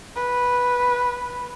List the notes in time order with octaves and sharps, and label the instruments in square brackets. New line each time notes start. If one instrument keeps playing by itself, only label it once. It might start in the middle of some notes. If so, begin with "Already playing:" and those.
[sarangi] B4